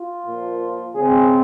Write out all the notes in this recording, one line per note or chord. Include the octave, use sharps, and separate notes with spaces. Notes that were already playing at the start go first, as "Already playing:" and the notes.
Already playing: F4
A#2 F3 A#3
C#3 G#3 C4 G#4